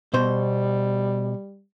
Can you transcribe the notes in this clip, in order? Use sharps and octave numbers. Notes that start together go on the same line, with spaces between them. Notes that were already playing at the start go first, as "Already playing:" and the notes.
B2 G3 C5